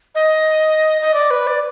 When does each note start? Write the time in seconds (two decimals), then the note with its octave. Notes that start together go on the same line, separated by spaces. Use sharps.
0.15 D#5
1.02 D#5
1.14 D5
1.31 B4
1.47 D5